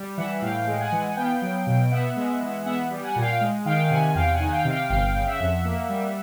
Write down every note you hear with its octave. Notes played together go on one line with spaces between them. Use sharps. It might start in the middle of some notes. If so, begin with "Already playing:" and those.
Already playing: G3
E3 E5 F#5
A2 F5 G5
G#3
F#5 G#5
E3
B3 F5 G5
F#3
B2
B3 E5 F#5
G#3
E3
B3 E5 F#5
G3
F#5 G#5
A#2
F5 G5
G#3
D#3 F5 G5
C3 F#5 G#5
E2 F5 G5
F#5 G#5
D#3
F5 G5
C3
F5 G5
G1 F5 G5
C#3
E5 F#5
F2
A#3
G3